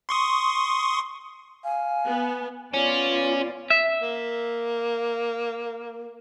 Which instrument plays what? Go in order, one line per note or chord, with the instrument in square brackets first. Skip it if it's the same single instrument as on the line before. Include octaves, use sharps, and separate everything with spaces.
[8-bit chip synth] C6 C#6 D#6
[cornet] F5 [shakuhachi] G#5
[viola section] B3
[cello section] B3 F4 D5 [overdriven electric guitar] C#4
[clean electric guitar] E5
[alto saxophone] A#3